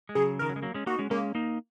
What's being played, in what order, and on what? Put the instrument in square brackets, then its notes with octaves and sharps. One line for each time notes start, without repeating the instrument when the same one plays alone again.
[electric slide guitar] G#3
[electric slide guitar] C#3 F#3 [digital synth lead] G#4
[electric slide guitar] D#3 [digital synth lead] A#4
[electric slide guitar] F#3
G#3
F#3 A#3
G#3 C#4
[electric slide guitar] A#3 D#4 [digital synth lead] F#4
[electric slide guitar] G#3 C#4
[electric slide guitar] G#3 C#4 [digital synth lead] A#3
[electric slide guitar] A#3 D#4